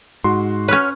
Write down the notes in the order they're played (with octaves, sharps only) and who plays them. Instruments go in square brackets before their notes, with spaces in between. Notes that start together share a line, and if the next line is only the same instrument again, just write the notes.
[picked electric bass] G#2 [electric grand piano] F#4 C6
[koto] C#4 B4 [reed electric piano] C#5 F6